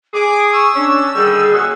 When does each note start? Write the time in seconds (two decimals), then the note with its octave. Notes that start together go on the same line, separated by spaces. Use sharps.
0.14 G#4 D6
0.53 C#6 E6
0.75 C#4 D4
1.15 D3 D#3 G3 G#4
1.52 A#2 C#4 F#4